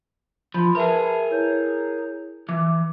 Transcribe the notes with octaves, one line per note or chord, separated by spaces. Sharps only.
F3 B5 C6
G#4 A#4 B4 E5 A5
E4 C#5 G6
E3 D6